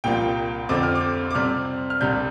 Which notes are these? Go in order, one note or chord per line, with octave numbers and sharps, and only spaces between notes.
C2 A#2 F3 A#3 G5
F2 D3 F3 C4 D6
F6
D6
D6
C3 G3 C4 F6
F6
C2 C3 G3 D4 G6